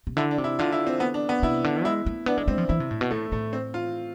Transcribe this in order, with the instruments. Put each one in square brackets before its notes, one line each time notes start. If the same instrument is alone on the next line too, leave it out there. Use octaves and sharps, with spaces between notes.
[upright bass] C3
[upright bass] D3 [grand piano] E4
[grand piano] D4
[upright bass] C3
[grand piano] E4
[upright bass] D3 [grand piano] F4
[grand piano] E4
C4
B3
D4
B3
[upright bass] C3 [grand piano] E4
[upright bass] D3
[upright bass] G#3 [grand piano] E4
[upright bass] A3
[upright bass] B3 [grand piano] D4
[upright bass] G#3
[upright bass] G#3 [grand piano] C4
[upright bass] F3
[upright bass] E3 [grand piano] E4
[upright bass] C3
A2
B2
[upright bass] A2 [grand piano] A3
[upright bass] A2 [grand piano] A3
[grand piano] C4
F4